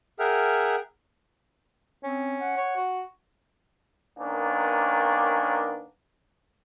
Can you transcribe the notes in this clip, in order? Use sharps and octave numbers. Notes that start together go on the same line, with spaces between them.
G#4 A#4 E5 F#5 G5 F6
C4 C#4
F#5
C#5
F#4
D#3 A#3 B3 C#4 D4